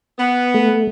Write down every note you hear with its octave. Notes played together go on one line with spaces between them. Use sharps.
B3
A3